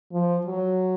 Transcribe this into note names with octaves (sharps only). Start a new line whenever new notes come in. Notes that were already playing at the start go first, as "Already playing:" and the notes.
F3
F#3